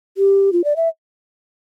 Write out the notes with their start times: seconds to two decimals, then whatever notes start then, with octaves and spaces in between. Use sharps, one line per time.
0.18 G4
0.53 F4
0.64 D5
0.76 E5